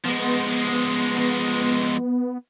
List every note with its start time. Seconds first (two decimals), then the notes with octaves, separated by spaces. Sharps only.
0.04 F3 G#3 B3